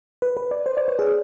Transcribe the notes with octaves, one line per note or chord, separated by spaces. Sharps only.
B4
B4
D5
C5
D5
C#5
G#4